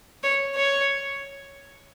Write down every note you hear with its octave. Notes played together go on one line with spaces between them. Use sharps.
C#5
C#5